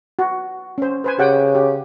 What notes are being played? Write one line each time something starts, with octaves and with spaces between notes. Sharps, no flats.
F#4
C#4 C5
B4 C5 G#5
C#3 G4 F#5 G5
G4